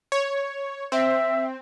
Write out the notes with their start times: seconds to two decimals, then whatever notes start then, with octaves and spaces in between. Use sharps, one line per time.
0.12 C#5
0.92 C4 E5